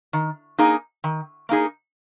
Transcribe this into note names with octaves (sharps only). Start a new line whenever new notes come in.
D#3
A#3 D#4 G#4
D#3
A#3 D#4 G#4